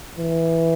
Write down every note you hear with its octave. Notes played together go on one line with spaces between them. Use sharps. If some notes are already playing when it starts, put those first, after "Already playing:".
E3